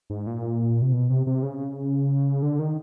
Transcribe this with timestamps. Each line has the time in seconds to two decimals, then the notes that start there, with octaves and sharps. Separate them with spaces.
0.10 G#2
0.27 A#2
0.82 C3
0.93 B2
1.10 C3
1.27 C3
1.43 C#3
2.42 D3
2.59 D#3